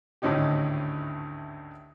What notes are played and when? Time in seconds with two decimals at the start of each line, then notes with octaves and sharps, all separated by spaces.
0.22 G#1 D2 A2 C#4 D#4 G4